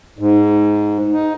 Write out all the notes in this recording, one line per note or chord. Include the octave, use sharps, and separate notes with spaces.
G#2
D#4